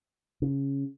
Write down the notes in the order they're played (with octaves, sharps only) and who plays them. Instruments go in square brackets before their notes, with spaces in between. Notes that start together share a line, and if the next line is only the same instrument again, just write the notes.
[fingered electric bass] C#3